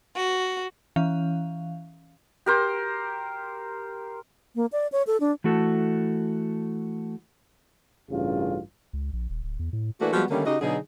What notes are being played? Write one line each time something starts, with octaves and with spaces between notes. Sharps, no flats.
F#4
E3 C#4 F5
G4 A#4 C5
A#3
D5
C#5
A4
D4
E3 A3 F#4 A4
A1 G2 C#3 F4
C#2
A#1
D#1
D1
E2
A2
E3 A3 A#3 D4 F#4
F3 G3 G#3 A#3 B3 F#4
D3 D#3 G3 A3 A#3 C#4
C#3 D#4 F#4 G4 D#5
B2 D3 F#3 D#4 G#4